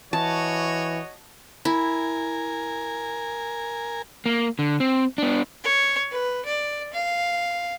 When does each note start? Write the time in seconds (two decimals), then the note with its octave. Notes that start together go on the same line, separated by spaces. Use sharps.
0.13 E3 F#4 C#5 D#5 A5
1.65 E4 A#4 G#5
4.26 A#3
4.59 D3
4.80 C4
5.18 B3 D4
5.64 C#5
6.11 B4
6.45 D5
6.93 F5